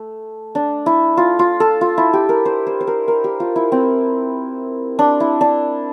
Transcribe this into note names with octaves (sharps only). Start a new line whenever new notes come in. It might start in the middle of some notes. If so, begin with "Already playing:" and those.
Already playing: A3
D4
E4
F4
F4
A4
F4
E4
G4
A#4
C5
C5
C5
A#4
A#4
G4
F4
E4
C4
D4
E4
D4